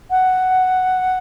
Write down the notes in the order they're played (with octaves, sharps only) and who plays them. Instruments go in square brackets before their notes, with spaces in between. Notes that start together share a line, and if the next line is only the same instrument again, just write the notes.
[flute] F#5